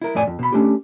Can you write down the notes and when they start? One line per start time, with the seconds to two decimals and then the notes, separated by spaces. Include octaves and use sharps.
0.02 E4 A#4
0.15 F2 A2 D5 G#5
0.27 F2
0.39 B2 B5
0.53 A3 C#4 D4 G4